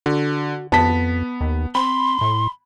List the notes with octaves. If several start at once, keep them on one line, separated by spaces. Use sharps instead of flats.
D3 F#4
F2 B3 A5 B6
D#2
C4 B5 C6
A2